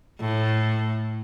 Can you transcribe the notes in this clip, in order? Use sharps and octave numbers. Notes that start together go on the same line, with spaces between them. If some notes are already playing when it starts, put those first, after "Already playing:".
A2